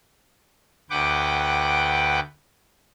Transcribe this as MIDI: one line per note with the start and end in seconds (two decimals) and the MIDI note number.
0.90 2.20 38
0.90 2.20 71
0.90 2.20 78
0.90 2.20 79
0.90 2.20 86